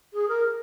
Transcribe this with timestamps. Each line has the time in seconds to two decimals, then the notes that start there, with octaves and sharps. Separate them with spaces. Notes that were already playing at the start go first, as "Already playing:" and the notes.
0.13 G#4
0.28 A#4